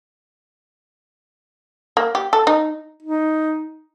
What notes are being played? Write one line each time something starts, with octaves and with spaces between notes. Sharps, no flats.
A#3
G4
A4
D#4
D#4